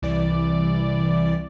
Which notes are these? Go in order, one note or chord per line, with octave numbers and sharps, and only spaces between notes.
C2 E3 D5